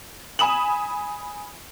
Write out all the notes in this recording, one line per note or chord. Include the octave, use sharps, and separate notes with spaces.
G#5 B5 D#6 E7 F#7